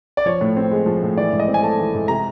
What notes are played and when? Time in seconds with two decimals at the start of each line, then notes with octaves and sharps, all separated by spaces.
0.17 D5
0.26 F3 C#5
0.41 A2
0.57 C4
0.71 G#3
0.86 F3
1.03 A2
1.17 E3 D5
1.33 G#2
1.40 D#5
1.48 C4
1.54 G#5
1.62 A3 A5
1.79 E3
1.94 G#2
2.08 C3 A#5